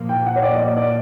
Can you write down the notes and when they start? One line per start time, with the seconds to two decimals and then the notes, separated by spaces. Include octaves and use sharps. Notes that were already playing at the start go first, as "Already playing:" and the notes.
Already playing: A#2 F3 A#3
0.09 G5
0.26 F#5
0.36 C#5
0.43 D5
0.54 D#5
0.60 D5
0.77 D5